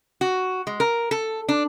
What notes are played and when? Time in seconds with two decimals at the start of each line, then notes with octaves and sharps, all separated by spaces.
0.21 F#4
0.67 G#3
0.80 A#4
1.11 A4
1.49 D4